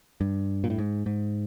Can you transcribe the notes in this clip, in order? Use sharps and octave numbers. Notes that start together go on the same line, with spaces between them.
G2
A#2
A2
G#2
G#2